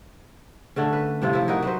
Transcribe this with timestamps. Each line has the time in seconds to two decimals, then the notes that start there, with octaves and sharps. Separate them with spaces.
0.76 D3 A3 C#4
0.93 B4
1.22 A2 C3 F4
1.33 F3 E4
1.48 D#4 E4 F#4 A#4
1.62 F#3 B4 C5